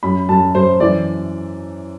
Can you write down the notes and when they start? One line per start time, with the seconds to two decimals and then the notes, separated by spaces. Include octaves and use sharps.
0.03 F#2 B5
0.29 F#2 A5
0.55 F#2 C5
0.80 E3 D5